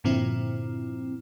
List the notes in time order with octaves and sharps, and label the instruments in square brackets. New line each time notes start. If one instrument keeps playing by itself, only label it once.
[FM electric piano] G2 A#2 D3 F3 C4 E4